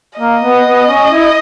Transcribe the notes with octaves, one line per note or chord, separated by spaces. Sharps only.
A#3 D#5
B3
B3
C#4
E4